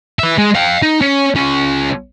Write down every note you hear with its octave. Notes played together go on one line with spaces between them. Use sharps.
B4 E5
G#3
F5 G5
D#4
C#4
C#2 C#4